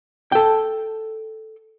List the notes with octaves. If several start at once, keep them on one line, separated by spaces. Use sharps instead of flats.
A4 G5